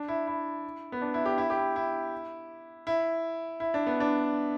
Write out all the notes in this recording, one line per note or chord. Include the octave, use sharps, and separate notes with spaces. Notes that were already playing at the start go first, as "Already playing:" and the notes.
Already playing: D4
E4
E4
B3
D4
E4
G4
E4
G4
E4
E4
E4
E4
D4
B3
D4